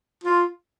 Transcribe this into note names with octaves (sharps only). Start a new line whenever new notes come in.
F4